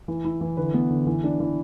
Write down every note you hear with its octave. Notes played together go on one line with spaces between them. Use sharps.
E3
E4
E3
D3 B4
B3
D3
E3
D4
E3